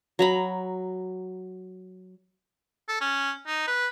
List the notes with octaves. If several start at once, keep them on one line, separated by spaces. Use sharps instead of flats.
F#3 A#5 B5
A4
C#4
D#4
B4